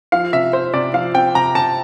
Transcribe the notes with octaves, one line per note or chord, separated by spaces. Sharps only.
F3 F5
C3 E5
C4 C5
C3 D5
F3 F5
C4 G5
C3 A#5
C3 A5